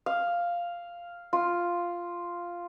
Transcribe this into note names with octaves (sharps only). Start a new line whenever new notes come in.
F5
F4